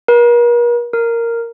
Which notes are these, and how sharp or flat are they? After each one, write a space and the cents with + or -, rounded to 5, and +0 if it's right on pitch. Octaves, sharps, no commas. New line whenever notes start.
A#4 +45
A#4 -5